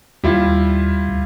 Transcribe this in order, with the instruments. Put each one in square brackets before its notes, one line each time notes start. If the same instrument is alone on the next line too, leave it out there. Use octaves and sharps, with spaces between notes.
[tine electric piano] D#2 [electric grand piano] G3 E4 F4
[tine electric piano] D2